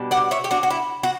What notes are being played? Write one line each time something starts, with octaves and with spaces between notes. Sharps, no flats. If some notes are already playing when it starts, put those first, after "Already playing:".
Already playing: B2 G3 D4
D5 F#5
C#5 E5
G4
D4 F#4
F#4
E4
F#4